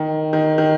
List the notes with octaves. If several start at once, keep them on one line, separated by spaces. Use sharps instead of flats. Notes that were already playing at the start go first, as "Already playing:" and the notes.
Already playing: D#3
D#3
D#3